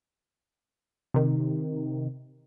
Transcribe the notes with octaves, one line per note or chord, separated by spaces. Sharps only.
C3 D#3